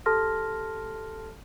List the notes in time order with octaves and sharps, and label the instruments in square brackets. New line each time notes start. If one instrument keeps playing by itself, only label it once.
[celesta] G4 A4 A5 C6 F6 A#6